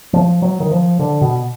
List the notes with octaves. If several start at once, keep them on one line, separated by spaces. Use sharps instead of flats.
F3
F#3
D#3
F3
D3
B2